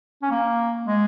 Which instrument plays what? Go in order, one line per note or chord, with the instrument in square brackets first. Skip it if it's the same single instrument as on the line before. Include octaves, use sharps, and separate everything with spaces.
[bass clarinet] C#4
A#3
G#3